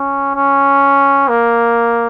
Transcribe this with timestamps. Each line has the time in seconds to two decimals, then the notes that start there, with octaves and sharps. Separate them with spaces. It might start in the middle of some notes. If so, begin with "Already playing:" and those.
Already playing: C#4
0.35 C#4
1.28 A#3